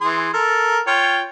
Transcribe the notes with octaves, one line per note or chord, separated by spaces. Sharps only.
E3 G#4 C6
A4 A#4
F4 C#5 G5